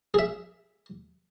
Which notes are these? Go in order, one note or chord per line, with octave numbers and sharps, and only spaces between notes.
G#4 E5